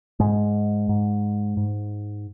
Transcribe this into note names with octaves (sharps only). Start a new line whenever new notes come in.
G#2 G#3
G#2
G#2